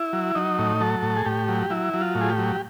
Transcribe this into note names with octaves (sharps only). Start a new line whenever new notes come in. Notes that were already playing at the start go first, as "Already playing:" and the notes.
Already playing: E4
F#3
F#3 D#4
A2
F#3 A4
A2
G#4
A2 G4
F#3
F#3 E4
F#3
F4
A2
G#4
G4
F#3